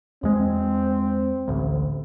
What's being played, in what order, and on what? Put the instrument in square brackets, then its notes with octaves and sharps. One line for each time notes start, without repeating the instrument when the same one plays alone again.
[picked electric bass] E2 G#3 [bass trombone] C4
[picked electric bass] A1 D2